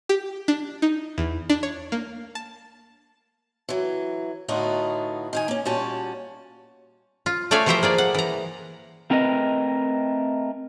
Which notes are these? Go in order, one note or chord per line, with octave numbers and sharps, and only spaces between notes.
G4
D4
D#4
E2
D4
C#5
A#3
A5
E3 F#3
A2 D3 B3 D#4 F4 F#4
D#3 D#4 G#5
A#3 C#4
A#2 G3 C#4 F#4 A5
F4
A3 C#5 D5 E5 F5 G#5
E3 F3 G4 C5 E5 A#5
A#3 G#4 D5
F#5
E3 A#5
A3 C4 A#4 B4 D#5